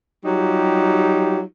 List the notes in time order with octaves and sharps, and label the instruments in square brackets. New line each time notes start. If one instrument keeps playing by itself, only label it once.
[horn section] F#3 G3 D#4 F4 G4